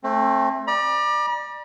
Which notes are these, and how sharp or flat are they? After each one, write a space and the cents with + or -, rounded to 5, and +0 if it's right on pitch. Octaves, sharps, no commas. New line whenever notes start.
A3 +0 C4 +30
D5 +25 B5 -45